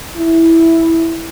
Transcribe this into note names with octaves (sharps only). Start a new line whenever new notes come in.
E4